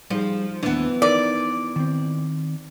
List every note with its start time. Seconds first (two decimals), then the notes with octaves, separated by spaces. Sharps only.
0.10 F3 G3 D#4 G#4
0.63 D#2 E3 B3 D4
1.02 D#4 A#4 B4 D5
1.76 D#3 C4